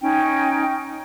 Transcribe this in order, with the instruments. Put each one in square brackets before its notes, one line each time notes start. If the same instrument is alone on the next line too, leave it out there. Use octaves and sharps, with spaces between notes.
[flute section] C#4 D#4 G5